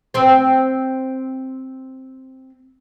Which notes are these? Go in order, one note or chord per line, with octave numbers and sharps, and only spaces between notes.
C4 C5